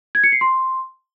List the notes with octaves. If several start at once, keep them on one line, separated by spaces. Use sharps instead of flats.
G#6
C#7
C7
C6